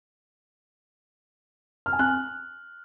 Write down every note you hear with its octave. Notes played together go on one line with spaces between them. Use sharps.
F6
G#5
F#6